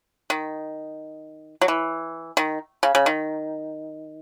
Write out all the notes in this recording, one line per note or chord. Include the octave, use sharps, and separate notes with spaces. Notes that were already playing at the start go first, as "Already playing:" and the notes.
D#3
F#3
E3
D#3
C#3
C#3
D#3